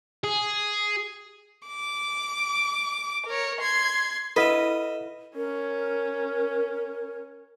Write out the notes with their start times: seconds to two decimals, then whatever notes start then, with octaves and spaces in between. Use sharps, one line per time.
0.24 G#4
1.67 D6
3.27 A#4 C#5
3.61 C6 G#6
4.36 E4 A4 B4 D#5 E5
5.36 C#4 A#4